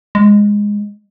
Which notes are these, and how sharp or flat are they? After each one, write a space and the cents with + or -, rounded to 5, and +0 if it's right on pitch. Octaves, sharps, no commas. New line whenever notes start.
G#3 -10